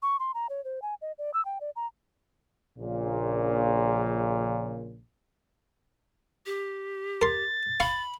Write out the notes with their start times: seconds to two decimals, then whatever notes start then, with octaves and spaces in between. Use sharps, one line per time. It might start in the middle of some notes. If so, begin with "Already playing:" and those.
0.02 C#6
0.20 C6
0.34 A#5
0.50 C#5
0.65 C5
0.82 G#5
1.02 D#5
1.18 D5
1.34 E6
1.45 G5
1.61 D5
1.76 A#5
2.78 A#1 A#2 C#3
6.46 G4
7.22 A#4 C6 A6
7.80 F5 B5 C#6